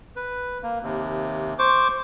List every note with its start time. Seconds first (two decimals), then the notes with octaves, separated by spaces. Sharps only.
0.16 B4
0.63 A#3
0.83 D#2 C3
1.59 C5 C#6 D6